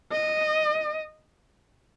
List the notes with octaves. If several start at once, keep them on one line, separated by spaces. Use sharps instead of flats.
D#5